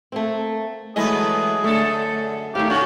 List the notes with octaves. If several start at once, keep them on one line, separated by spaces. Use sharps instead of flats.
A3 A#3 C4
E3 F#3 G#3 A3 G#4 B4 D#5
F#2 D3 A3 A4
D#3 A3 G4 F5
D3 C#4 F#4